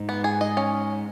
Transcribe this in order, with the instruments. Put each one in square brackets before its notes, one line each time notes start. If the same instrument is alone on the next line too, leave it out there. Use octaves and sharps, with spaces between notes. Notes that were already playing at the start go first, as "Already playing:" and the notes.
Already playing: [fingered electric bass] G#2
[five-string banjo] B3
G#4
D#5
C#4